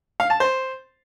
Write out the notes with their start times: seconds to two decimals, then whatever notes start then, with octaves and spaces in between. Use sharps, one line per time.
0.20 F5
0.30 A5
0.40 C5